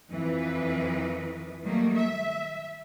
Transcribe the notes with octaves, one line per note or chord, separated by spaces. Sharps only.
F2 E3 B4
D#3 F#3 G3 A3 A#3
E5